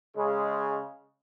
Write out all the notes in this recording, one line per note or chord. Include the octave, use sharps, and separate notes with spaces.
C#3 G#3